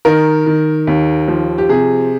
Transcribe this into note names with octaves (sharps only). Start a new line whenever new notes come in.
D#3 A#4
D#3
D#2
F3
G4
C3 G#4